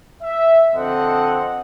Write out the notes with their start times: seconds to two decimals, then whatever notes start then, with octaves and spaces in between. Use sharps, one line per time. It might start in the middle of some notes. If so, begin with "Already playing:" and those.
0.23 E5
0.74 D3 F3 C4 A4 D#5 F#5